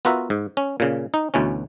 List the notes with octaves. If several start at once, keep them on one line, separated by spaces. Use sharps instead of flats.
B3 F4 F#4 A#4 E5
G#2
C#4
A#2 C#3
D#4
D2 B2 E3 C#4